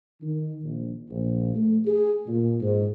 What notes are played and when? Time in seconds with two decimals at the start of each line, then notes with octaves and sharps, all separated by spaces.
0.22 D#3
0.62 A#1
1.09 A#1
1.55 A3
1.86 G#4
2.26 A#2
2.61 G#2